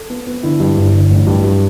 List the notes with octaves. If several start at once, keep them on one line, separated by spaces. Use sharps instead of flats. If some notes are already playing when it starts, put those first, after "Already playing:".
Already playing: A4
B3
B3
D3 E4
G2
G1
D3
A1
G2
G2